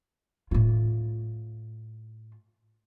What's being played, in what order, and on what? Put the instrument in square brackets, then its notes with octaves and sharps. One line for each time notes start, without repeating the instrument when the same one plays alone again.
[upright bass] A2 F4